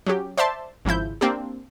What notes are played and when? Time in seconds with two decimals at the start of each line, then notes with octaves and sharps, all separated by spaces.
0.06 F#3 C#4 G4
0.38 C5 D5 E5 A5 C6
0.85 G#1 C#3 F3 E4 G6
1.21 A#3 C4 D4 G4